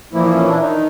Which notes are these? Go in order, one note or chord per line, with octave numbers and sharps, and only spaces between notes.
A#2 E3 F3 A#3 E4
C#4
D4
D#3 D#4